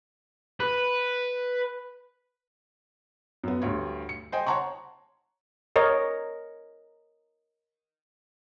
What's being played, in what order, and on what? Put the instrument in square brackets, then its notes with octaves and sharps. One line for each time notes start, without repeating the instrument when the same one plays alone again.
[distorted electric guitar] B4
[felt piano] F#2 B3
D2 G2 C#5
C#7
C5 D#5 G5 G#5
C#5 F#5 A5 A#5 C6 C#6
[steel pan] A#4 C#5 D#5